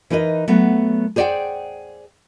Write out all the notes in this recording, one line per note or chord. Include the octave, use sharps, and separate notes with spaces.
E3 D#4 A#4 B4 D#5
F#3 A3 B3
G#4 C5 D5 D#5 F#5 G5